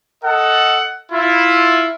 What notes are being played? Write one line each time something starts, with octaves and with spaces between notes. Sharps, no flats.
A4 D#5 F#5
E4 F4